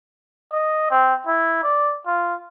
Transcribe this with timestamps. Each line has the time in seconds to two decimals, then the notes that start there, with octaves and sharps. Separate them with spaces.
0.52 D#5
0.90 C4
1.26 E4
1.63 D5
2.06 F4